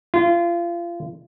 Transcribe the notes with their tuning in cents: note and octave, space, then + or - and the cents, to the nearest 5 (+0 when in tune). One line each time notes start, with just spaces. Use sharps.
F4 -30